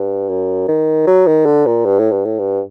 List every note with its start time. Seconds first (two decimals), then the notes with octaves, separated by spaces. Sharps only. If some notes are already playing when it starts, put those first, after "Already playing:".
Already playing: G2
0.29 F#2
0.68 D#3
1.07 F#3
1.27 D#3
1.46 D3
1.66 A#2
1.85 G2
1.99 A2
2.11 G2
2.25 A2
2.39 G2